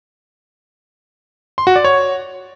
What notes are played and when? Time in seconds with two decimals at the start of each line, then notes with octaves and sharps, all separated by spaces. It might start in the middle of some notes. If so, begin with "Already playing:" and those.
1.58 C6
1.67 F#4
1.76 D5
1.84 C#5